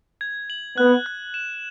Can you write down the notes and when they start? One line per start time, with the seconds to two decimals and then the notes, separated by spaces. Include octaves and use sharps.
0.21 G#6
0.50 F#7
0.78 B3 F#6
1.06 F#6
1.34 E7